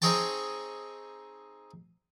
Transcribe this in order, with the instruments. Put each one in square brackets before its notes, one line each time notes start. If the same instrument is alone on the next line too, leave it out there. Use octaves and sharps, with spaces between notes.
[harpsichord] C4 D#4 G#4 C#5 G5 A5